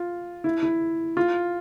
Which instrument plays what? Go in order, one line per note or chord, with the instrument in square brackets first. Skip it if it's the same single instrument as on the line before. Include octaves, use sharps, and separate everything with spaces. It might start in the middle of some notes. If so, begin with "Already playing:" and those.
Already playing: [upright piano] F4
E4
E4
F4